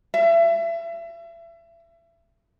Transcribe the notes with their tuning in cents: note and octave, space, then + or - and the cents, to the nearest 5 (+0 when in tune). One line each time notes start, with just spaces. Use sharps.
E5 +30